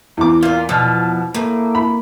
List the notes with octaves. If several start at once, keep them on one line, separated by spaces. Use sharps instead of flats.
E2 D6
A#2 F4 D5
B2 F3 A5 F6
A2 A#3
B5